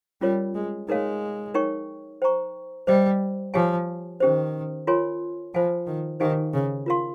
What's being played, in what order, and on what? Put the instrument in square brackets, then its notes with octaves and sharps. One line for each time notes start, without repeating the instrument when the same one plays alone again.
[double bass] G3 [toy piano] C#4 F4 A#4 C#5
[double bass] G#3
[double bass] G#3 [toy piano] D#4 A#4 C#5 F5
[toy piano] D#4 A#4 C#5 G5 C#6
C5 G5 A#5 C#6
[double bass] G3 [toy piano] C5 D#5 G5
[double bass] F3 [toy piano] G4 C#5 F5 G#5
[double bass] D#3 [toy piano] C#4 G4 C5
[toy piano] F4 A#4 C#5 G#5 C6
[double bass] F3 [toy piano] F4 C5 F5 G#5
[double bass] D#3
[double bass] D#3 [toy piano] D#4 G4 C5 F5 G#5
[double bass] C#3
[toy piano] F4 A#4 F5 C6